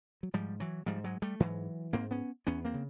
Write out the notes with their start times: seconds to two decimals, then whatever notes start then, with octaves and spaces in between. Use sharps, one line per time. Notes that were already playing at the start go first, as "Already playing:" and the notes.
0.23 F#3
0.34 G#2 F3 G3
0.60 E3 F#3
0.86 G#2 F3 G3
1.04 F#3 G#3
1.22 G3 A3
1.40 G#2 E3 F#3
1.93 G#2 A#3 C4
2.11 B3 C#4
2.47 E2 B3 C#4
2.65 A#3 C4
2.74 C#3